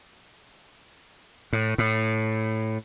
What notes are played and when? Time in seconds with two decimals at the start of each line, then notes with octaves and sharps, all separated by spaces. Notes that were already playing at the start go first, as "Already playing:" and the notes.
1.53 A2
1.78 A2